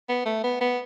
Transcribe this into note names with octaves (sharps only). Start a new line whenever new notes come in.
B3
A3
B3
B3